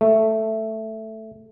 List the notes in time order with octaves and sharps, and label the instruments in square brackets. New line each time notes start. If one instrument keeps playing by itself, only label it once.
[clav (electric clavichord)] A3